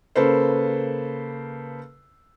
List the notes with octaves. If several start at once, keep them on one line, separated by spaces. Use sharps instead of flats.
C#3 A#3 A4 B4 C5